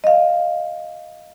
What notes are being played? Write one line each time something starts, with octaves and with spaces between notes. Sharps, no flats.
D#5 F5